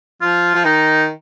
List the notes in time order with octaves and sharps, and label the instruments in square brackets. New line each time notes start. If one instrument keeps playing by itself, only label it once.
[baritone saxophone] F3 [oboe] F4
[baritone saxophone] F3
[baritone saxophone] D#3 [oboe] D#4